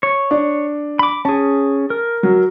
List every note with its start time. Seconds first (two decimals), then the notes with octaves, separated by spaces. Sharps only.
0.03 C#5
0.31 D4
0.99 B5 D6
1.25 C#4 G#4 A5
1.90 A#4
2.23 F#3